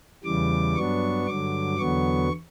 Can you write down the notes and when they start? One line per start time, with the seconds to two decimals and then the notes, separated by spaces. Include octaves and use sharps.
0.24 E2 C#3 E3 G3 D6
0.75 G2 F#3 B3 D4 C#6
1.27 G2 D3 F#3 D6
1.78 E2 D3 F#3 B3 C#6